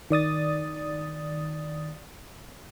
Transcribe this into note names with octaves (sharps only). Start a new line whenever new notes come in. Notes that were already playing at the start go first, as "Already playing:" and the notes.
D#3 D5 D#6 A6